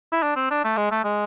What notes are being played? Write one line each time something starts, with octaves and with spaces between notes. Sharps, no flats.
E4
D4
C4
D4
A3
G#3
A3
G#3